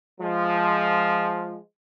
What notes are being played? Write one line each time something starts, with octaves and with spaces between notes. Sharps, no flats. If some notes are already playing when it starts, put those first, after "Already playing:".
F3 G#3